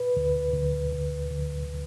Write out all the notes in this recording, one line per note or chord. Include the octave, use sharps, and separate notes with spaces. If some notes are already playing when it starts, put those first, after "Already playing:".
Already playing: B4
D2
D2
D2
D2